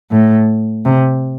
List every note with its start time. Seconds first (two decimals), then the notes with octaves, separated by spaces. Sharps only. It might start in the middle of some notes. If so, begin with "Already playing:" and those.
0.11 A2
0.85 C3